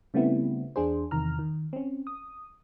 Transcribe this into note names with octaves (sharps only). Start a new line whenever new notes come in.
C#3 G3 A3 B3 C4 E4
E2 D4 G#4 C5
E2 C3 D#3 A#5 F6
D#3
C4 C#4
D#6